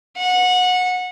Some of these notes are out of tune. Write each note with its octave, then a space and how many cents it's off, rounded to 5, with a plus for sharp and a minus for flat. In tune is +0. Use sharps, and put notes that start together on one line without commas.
F#5 -20